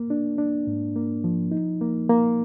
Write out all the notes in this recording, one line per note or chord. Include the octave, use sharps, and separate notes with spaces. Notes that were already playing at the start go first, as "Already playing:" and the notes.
Already playing: A#3
D4
D4
G#2
A#3
F3
D#4
A#3
A#3